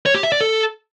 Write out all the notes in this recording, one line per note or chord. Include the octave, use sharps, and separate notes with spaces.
C#5
G4
E5
D5
A4